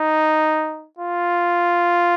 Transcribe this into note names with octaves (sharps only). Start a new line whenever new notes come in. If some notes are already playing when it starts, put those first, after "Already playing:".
Already playing: D#4
F4